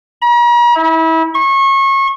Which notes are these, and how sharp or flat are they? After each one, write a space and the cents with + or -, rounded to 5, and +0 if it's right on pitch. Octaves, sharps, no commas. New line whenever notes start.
A#5 +45
E4 -30
C#6 -30